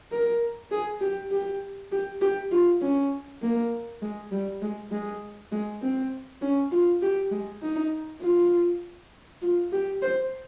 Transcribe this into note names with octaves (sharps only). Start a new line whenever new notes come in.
A#4
G#4
G4
G4
G4
G4
F4
C#4
A#3
G#3
G3
G#3
G#3
G#3
C4
C#4
F4
G4
G#3
D#4
F4
F4
G4
C5